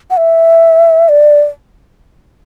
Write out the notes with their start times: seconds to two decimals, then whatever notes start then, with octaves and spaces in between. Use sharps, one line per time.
0.10 F#5
0.17 E5
1.09 D5